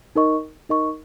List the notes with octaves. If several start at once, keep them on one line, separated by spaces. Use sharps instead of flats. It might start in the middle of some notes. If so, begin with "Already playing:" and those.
D#4 A#4 D#5 C#6
D#4 A#4 D#5 C#6